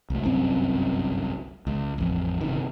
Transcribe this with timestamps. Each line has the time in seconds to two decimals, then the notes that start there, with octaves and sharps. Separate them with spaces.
0.10 C2 A3
0.23 G1 C2 F#2 C4
1.67 C#2
1.98 A1 F2
2.41 G1 C3 D#3